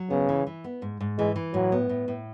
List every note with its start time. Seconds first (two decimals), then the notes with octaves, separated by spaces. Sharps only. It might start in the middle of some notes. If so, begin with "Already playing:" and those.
Already playing: F#3
0.10 C#3 B3
0.29 E3
0.47 E3
0.64 B3
0.82 G#2
1.01 G#2
1.19 E3 G#3
1.36 E3
1.54 A2 F#3
1.72 B3
1.89 A2
2.08 A2